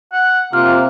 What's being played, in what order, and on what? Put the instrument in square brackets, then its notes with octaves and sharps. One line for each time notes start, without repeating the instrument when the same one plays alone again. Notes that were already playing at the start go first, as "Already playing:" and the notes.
[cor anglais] F#5
[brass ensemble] C3 [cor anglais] A#3 [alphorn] F4 [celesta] F6